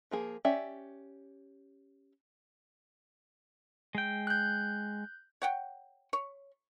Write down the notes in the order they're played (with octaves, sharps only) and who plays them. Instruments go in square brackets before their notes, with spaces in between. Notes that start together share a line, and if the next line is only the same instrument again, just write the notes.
[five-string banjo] F3 A#3 G#4
C#4 G4 D5 E5
[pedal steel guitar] G#3 G5
[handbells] F#6 G6
[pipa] C#5 F#5 G5
C#5